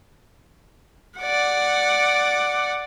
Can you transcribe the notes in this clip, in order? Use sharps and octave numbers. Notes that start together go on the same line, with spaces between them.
D5 F#5